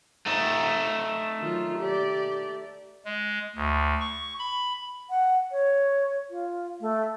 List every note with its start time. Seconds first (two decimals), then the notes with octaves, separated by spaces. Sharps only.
0.26 A3 D#4
1.39 D#3 F#3 F4
1.78 G4 D5
3.05 G#3
3.55 D2
4.01 C#6
4.39 B5
5.10 F#5
5.52 C#5
6.30 F4
6.81 A3